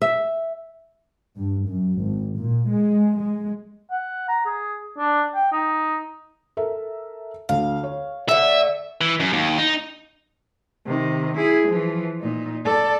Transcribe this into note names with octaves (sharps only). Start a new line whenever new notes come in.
E5
G2
F#2
G#1
A#2
G#3
G#3
F#5
A#5
G#4
D4
G5
D#4
A4 A#4 E5
D2 F5
C#5
D3 A3 E5
E3
F#2
D#2
D#4
C3 D#3
E4 G#4
E3 F3
A#2 D#4
A4 D5